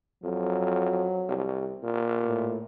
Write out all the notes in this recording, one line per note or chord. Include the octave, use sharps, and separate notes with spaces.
F2 F#3
C2
A#2
A2